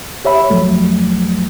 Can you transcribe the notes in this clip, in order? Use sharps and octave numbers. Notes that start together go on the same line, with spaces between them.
G4 C#5 E5 B5
F2 F3 F#3 A3